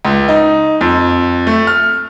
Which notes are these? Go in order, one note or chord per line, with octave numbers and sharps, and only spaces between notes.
C#2
D#4
F2
A3
F6